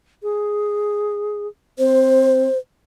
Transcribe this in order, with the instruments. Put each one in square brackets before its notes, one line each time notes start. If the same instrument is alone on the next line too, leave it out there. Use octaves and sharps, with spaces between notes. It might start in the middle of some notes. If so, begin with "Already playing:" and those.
[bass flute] G#4
[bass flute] C4 [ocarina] C5